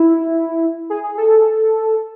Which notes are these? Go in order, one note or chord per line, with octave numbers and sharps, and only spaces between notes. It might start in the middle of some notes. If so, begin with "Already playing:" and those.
Already playing: E4
G#4
G#4
A4